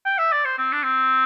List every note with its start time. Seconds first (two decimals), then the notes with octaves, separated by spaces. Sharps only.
0.06 G5
0.18 E5
0.32 D5
0.45 C5
0.58 C4
0.72 D4
0.83 C4